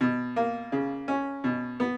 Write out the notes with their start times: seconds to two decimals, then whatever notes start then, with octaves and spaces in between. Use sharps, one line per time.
0.01 B2
0.36 A#3
0.72 C#3
1.08 C#4
1.44 B2
1.80 B3